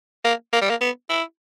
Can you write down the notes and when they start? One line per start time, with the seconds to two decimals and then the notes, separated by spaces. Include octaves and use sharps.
0.24 A#3
0.52 A#3
0.61 G3
0.70 A#3
0.81 B3
1.09 E4